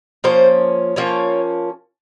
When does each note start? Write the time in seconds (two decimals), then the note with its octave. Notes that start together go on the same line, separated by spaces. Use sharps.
0.24 F3 A#3 C#4 C5
0.96 F3 A#3 C#4 C#5